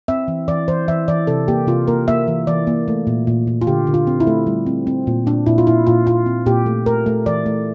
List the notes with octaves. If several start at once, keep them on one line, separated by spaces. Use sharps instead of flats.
C4 E5
E3
E3 D5
E3 C5
E3 E5
E3 D5
C3 A4
A#3 G4
C3 F4
A#3 A#4
A#3 E5
E3
E3 D5
A#3
A3
A#2
A#2
A#2
F4
D3 G4
D3
F4
C4
E4
A3
G3
C4
C4
A#2
A#2 D4
A#2 E4
F4
A#2 E4
A#2 F4
A#2 F4
C4
A#2 G4
A3
A3 A#4
A3
E3 D5
A3